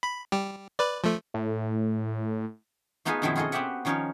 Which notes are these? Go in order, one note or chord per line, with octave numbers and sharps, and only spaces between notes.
B5
G3 G4
B4 D5
F3 A3
A2
A3 B3 D#4 F4 G#4 B4
F#2 B2 D#3 F3 C4 E4
F4 F#4 G#4 A4 D#5
B3 C4 F#4 G4 E5 F#5
D#3 F3 C#4 D#4 A#4 C#5